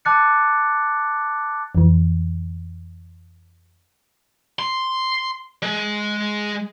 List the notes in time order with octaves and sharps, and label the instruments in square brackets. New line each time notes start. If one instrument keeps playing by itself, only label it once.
[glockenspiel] A5 D6 F#6 A6 C#7
[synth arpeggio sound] F2 E3
[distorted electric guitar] C6
G#3